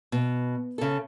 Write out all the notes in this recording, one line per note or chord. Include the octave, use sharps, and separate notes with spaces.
B2
C#3 A4